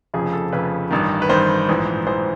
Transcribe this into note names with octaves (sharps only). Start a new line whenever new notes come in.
F1 F2 C#3 F3 G#4
A4
F1 F2 C#3 F3 B4
A1 G2 D#3
B4
A1 G2 D#3 C5
A#1 G#2 E3
A#1 G#2 E3 C5